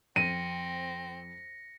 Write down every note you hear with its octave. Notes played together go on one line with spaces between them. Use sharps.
F2 C4 A#6 B6 C#7 D#7